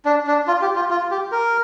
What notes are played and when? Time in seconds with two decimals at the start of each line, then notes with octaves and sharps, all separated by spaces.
0.05 D4
0.27 D4
0.47 F4
0.62 G4
0.76 F4
0.90 F4
1.11 G4
1.32 A#4